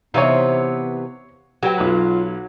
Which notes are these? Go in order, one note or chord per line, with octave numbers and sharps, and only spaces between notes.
C3 E3 B3 D#4 C#5 F5
F#3 F#4 B4 G5
B1 F4 B4